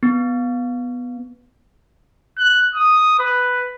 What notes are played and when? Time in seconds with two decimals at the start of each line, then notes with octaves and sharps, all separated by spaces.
0.03 B3
2.38 F#6
2.75 D#6
3.20 B4